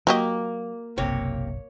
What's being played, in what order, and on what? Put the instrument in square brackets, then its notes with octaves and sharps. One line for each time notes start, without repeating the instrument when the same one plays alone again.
[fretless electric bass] F#3 [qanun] A#3 [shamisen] F#4 G4 D#5
[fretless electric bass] F#1 B1 [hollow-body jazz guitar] C3 A#3 [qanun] C#5